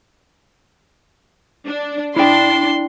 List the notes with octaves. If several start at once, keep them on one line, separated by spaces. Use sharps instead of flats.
D4
D4 E4 G5 C6